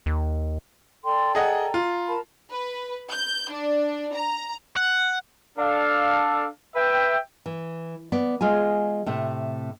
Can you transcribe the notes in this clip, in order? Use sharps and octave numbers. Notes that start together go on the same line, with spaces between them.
D#2
A4 D5 G5 C6
G#4 D#5 F#5 A#5
F4
A#4 A5 B5
B4
G6
D4
A#5
F#5
D4 A4 F5
B4 E5 G5
E3
B3 D5
G#3 F4 G#4 G#5
A2 C3 A3